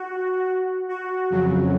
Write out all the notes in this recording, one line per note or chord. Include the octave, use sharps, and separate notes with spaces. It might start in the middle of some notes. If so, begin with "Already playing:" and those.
Already playing: F#4
F#4
F2 C#3 F#3